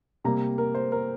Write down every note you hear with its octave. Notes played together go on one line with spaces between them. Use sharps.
C3 G3 A#3 A#5
A#4
C5
A#4